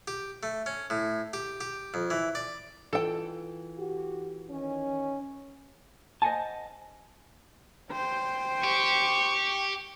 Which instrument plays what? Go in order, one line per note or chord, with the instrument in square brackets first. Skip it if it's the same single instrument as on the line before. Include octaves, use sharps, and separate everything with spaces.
[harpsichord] G4
A3
C#4
A2
G4
G4
F2
E3
D5
[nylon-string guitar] E3 F4 [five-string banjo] A4 G5
[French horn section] F#4 G4
D#3 C#4
[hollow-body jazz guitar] C5 D#5 F5 F#5 G#5 A5
[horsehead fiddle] C5 [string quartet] G5
[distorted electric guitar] G4 [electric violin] C#6